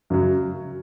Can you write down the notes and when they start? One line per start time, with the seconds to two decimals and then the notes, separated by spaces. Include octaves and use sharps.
0.10 F#2 C#3 F#3